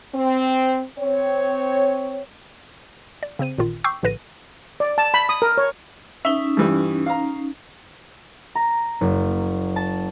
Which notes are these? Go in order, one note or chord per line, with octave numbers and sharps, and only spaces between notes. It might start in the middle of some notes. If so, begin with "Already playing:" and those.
C4
C4 C#5
D5
C#3 C4 C5 D#7
A1 A#2 D#3 F4
G5 C#6 D6 E6 G6 C7
A#1 A2 D3 B4 A#6 D#7
D5
A5
B5
D#6
A#4
C#5
C#4 D#4 E5
G2 E3 G3
F5 A#5
A#5
F#1
A5